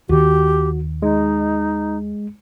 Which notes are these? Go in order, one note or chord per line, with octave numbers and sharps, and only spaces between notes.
D#2 D#3 F#4 G4
G#3 D#4